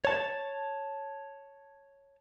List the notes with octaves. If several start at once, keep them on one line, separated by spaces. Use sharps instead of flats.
C#5 A5